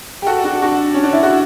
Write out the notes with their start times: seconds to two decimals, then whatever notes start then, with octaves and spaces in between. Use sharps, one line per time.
0.22 G4
0.26 F#4 A4
0.44 D4 F#4
0.62 D4 F#4
0.94 C#4
1.03 D4
1.13 E4
1.23 F#4